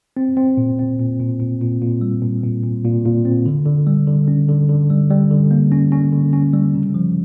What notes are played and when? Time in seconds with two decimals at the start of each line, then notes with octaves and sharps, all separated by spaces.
0.17 C4
0.37 C4
0.57 A#2
0.79 C4
0.99 A#2
1.20 A#2
1.40 A#2
1.61 A#2
1.82 A#2
2.01 G3
2.22 A#2
2.43 A#2
2.64 A#2
2.85 A#2
3.05 A#2
3.25 C4
3.46 D3
3.66 D3
3.86 G3
4.07 D3
4.28 C#4
4.49 D3
4.69 D3
4.90 G3
5.10 G3
5.31 D3
5.51 A#3
5.72 C#4
5.92 C#4
6.12 D3
6.33 C#4
6.54 G3
6.75 C#3
6.94 F3